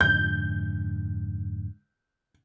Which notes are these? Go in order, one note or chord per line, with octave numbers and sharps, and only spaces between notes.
F2 G#2 D3 G6